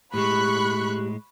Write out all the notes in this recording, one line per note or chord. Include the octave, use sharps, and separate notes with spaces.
A2 G#3 G4 B5 C#6 F#6